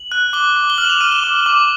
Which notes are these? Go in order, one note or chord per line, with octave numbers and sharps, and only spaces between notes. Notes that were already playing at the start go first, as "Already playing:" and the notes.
Already playing: F#7
F#6
D6 G7
D6
G7
F6 F#7
E7
F7
F6 D#7
E7
D6
D6